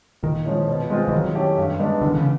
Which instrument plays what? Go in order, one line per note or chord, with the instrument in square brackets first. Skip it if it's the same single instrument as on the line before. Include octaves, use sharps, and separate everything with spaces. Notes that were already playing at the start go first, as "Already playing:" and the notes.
[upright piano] A#2 [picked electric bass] D#3
[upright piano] F3 G#3 C#4 E4
B2
G#3 C4 F4 G#4
[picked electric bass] E3
[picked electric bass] D#3 [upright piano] F#3
[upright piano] A3 C#4 E4 G4
G2
D#3 G#3 B3 D4
[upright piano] E2 [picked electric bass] D3
[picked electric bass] C#3